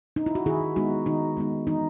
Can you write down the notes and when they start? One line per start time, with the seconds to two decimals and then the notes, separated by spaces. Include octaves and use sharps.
0.16 D#4
0.26 E4
0.35 F#4
0.46 D#3 E4 G#4
0.76 G#3 B3 D#4 F#4
1.06 D#3 D#4
1.37 G#3 B3 D#4
1.67 E3 D#4